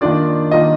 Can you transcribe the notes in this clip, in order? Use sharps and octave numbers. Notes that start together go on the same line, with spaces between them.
D#3 A#3 D4 F4 D5
D#3 A#3 D4 F4 D#5